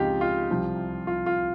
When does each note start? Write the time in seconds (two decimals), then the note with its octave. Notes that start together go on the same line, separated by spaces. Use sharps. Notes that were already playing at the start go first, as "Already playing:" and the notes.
Already playing: C#2 C#3 F3 C4 D#4 F4 G4
0.21 F4
0.50 C2 C3 F3
1.07 F4
1.26 F4